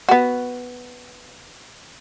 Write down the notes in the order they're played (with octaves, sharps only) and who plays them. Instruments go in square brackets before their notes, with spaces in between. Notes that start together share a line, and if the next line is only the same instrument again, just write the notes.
[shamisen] B3 F#4